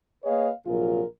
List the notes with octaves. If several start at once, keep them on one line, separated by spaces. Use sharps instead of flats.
A#3 G#4 B4 C#5 D#5 F5
A#1 C3 F#3 F4 G#4 A#4